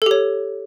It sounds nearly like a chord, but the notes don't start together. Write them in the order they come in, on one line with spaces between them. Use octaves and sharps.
A4 G4 C#5